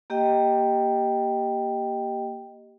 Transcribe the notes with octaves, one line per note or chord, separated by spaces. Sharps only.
A#3 G4 D#5 G5